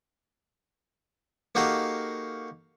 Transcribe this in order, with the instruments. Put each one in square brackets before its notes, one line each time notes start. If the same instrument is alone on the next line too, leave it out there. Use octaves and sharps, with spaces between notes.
[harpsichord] A#3 D#4 F#4 G4 A4 F5